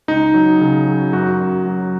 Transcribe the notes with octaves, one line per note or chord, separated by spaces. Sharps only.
C#2 D#4
F#3
C#3
F#3
F#2 F#4
F#2
F#3